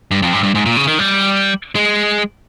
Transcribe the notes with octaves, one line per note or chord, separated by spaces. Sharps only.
G2
F2
G2
G2
G#2
A#2
C#3
D#3
G3
G#3